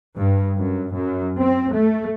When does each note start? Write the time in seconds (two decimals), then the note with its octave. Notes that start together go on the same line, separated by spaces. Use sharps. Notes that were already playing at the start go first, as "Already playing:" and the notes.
0.17 G2
0.58 F#2
0.94 F#2
1.40 C4
1.73 A3